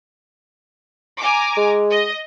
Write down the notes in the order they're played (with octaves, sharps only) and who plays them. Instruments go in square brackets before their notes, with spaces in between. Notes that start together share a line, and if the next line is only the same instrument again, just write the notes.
[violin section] G#5 A#5 D6
[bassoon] G#3
[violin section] D#5